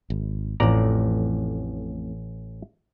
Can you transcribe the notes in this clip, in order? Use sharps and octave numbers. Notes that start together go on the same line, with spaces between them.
G#1
A1 F2 A2 D5 A#5